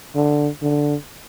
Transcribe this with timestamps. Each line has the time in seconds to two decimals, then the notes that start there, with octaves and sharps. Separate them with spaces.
0.15 D3
0.62 D3